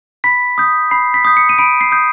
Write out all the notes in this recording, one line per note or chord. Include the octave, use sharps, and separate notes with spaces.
B5 B6
D#6 G6
B5 C7
B6
D#6 G6
C#7
D#7
B5 D7
C7
D#6 G6